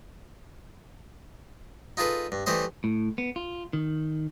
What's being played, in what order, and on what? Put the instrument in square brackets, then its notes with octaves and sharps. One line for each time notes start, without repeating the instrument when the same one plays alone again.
[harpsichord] D#4 F4 G#4 A4 B4
G2
E3 G3 A3 C5 D#5
[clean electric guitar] A2
B3
F4
D#3